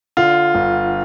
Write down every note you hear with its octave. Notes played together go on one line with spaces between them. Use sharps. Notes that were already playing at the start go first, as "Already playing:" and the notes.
D3 F4
G1